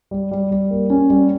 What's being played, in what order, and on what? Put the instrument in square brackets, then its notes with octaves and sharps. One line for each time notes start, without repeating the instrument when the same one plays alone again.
[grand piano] G3
G3
G3
A#3
C#4
G3